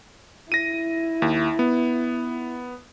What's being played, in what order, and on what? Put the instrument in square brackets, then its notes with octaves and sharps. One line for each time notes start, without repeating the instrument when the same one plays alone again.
[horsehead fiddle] E4 [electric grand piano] A#6 D#7
[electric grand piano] D#2
B3